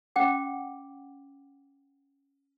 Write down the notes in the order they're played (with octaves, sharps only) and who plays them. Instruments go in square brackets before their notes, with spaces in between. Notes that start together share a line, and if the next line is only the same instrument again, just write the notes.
[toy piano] C#4 F#5 G5 D6